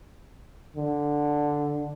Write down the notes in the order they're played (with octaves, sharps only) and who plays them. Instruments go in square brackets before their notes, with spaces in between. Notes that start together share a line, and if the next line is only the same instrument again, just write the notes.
[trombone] D3